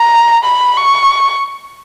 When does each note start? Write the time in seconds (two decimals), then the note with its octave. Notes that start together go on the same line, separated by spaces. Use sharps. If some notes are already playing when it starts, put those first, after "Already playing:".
Already playing: A#5
0.45 B5
0.77 C#6